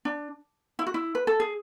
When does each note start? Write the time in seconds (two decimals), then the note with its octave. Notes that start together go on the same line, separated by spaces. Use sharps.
0.05 D4
0.79 E4
0.87 F#4
0.94 E4
1.15 B4
1.27 A4
1.40 G#4